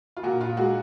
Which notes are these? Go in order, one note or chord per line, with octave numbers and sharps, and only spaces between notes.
F4
A#2 F#4
F4
G#3 F#4